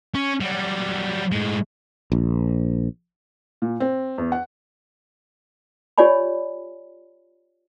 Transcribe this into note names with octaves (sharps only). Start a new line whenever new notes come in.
C#4
F#3 G3
A2 G#3
A#1
A#2
C4
E2
F#5
F4 G4 C#5 D5 G#5 B5